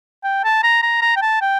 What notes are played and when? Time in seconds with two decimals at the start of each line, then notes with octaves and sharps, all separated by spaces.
0.24 G5
0.44 A5
0.63 A#5
0.83 A#5
1.02 A#5
1.16 G5
1.22 A5
1.41 G5